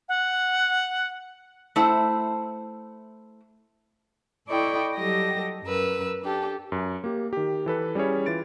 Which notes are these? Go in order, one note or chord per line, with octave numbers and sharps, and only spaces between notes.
F#5
A3 E4 C5 F#5
E4 A4 D5 D#5 G5 C#6
F#3 G3 G4 A4 D#5 A#6
F#2 A#4 B4 E6
D4 G4 A4
F#2
A#3 G4
D#3 G4
E3 A4 B4
G3 C#4 E4 G#4 C#5
E3 F4 A6 D7